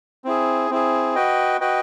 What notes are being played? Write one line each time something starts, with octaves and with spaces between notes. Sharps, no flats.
C4 E4 G#4
C4 E4 G#4
F#4 B4 D#5 G5
F#4 B4 D#5 G5